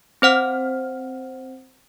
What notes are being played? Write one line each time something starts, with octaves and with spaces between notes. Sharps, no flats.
C4 C5 F#5 F6